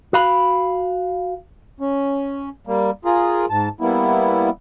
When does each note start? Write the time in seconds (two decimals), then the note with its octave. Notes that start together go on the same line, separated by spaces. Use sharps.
0.13 F#4 F5 B5
1.80 C#4
2.67 G3 A#3
3.05 F4 G#4 A#4
3.49 G#2 A5
3.81 G3 A#3 B3 E4